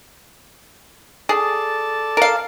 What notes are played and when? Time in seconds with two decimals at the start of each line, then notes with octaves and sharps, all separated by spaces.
1.29 G#4 A4 D5 A5
2.17 A#4 F5